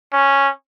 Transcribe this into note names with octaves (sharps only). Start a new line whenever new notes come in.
C#4